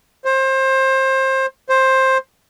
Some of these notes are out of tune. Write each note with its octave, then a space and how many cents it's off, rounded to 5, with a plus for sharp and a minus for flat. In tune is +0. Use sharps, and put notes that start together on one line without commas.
C5 +25
C5 +15